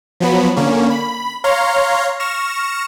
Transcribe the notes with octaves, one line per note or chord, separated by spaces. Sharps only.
F3 F#3 B3 B5
D3 A#3 C#4
B5
C#5 F5 A#5 C6
C#6 F6 A#6 E7